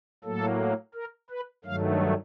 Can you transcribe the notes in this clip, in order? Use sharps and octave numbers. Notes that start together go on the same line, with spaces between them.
A2 F#3 A#3 A4
A#4
B4
G2 D#3 F#3 A3 F5